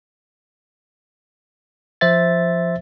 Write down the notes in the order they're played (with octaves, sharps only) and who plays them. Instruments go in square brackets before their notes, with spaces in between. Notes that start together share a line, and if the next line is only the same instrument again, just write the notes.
[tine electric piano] F3 C5 E5 A6